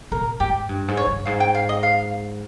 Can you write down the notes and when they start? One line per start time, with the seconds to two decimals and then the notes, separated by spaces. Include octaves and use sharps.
0.12 A#2 A#4
0.40 G#2 G4
0.69 G2
0.88 G#2
0.97 C#5
1.07 G2
1.25 G#2 F5
1.40 G5
1.55 F5
1.69 D#5
1.83 F5